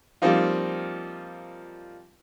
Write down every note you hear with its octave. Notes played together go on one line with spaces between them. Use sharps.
F3 G3 A#3 C4 D#4 F4